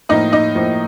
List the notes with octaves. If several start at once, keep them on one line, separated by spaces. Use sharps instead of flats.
A2 F3 A#3 D#4 D#5
D#4 D#5
A2 F3 A#3